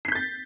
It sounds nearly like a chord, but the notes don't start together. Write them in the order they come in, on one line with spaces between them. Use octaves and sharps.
C7 B6 G6 A6